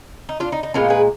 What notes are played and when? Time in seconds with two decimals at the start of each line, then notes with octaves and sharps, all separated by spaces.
0.29 D#4
0.40 D4 F4
0.52 D#4
0.63 D#4
0.74 A#2 G#3 B3 D4 F4
0.90 G#4 B4